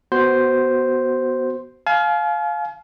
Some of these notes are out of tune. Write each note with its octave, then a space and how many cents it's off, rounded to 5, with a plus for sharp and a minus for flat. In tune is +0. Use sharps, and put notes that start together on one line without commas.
B3 +0 F#4 +15 C5 +0
F5 +0 G#5 +45